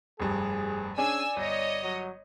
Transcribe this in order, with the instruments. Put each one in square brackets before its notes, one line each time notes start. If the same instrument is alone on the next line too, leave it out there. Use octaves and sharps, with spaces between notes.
[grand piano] F1 G2 [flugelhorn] G#4
[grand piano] C#4 D4 G#4 [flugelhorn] D5 [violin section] G#5 E6
[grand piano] G1 [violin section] C#5 D#5
[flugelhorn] F#3